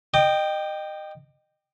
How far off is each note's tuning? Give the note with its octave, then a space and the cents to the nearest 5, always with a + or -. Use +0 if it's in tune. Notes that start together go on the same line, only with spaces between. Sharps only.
D#5 -20 G5 +0 D6 +35